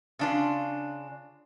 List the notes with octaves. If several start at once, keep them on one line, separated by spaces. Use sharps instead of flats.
C#3 D4 F4